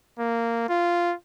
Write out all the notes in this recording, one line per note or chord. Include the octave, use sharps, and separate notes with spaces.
A#3
F4